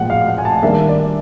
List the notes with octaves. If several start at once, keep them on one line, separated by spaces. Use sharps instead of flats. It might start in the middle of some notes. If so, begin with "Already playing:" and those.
Already playing: A#2 F3 G#3 F#5 G5
F5
F#5
G#5
A5
D#3 G3 A#3 D4 E5
D5